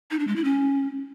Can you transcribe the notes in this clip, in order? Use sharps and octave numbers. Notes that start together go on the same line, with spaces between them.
D#4
D4
G#3
E4
C#4